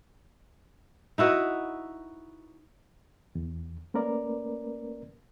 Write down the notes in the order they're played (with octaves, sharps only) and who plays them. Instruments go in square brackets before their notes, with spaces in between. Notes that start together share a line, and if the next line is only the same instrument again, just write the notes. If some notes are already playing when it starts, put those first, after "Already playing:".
[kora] D#4 E4 F#4 B4
[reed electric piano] E2
A3 A#3 C#4 A#4 B4 D5